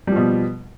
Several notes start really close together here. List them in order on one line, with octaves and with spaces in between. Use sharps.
G3 F3 B2